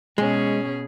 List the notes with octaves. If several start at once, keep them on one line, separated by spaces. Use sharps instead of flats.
B2 G#3 C#4 G#4